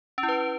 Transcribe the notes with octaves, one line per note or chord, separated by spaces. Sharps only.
C#4
E4
B4